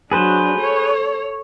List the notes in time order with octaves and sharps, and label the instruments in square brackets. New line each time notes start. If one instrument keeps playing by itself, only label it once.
[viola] F#3 D4 [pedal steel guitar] G#4 B4 C5
[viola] A4 C#5